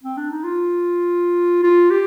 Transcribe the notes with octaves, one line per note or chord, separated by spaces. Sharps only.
C4
D4
D#4
F4
F4
G4